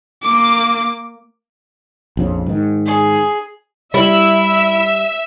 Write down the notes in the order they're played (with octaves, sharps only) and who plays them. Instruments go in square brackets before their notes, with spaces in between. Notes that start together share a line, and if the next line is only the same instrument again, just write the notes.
[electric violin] A#3 D6
[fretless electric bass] A#1 F2 C#3
G#2 D#3
[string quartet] G#4
[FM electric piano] G3 [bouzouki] E4 [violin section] E5